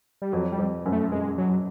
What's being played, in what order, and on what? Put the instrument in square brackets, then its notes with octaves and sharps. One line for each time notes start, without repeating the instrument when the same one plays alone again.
[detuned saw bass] G3
[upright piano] F2 [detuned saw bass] F#3
[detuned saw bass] G3
[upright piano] F2
F#2
[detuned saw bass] A3
[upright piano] F#2 [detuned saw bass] G#3
[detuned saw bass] F#3